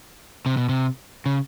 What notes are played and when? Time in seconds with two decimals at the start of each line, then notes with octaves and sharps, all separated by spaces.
0.46 C3
0.57 B2
0.69 C3
1.26 C#3